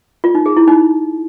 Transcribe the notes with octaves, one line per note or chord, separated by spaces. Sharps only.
F4
D#4
G#4
E4
D#4